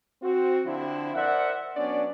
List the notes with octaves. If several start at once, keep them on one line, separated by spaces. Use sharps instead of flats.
C4 F#4
D3 F3 C4 D4 E4
A#4 C5 D5 E5 F#5
F#3 B3 C#4 D4 D5